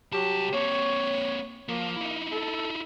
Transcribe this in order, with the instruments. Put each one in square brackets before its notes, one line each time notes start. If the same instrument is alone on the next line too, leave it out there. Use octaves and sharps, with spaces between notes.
[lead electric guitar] C2 A5 [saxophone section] F#3 G4
[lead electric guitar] A#3 C4 [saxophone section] C#5
[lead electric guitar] F3 [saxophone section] A#3
[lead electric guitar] D#4 E4
[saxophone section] A4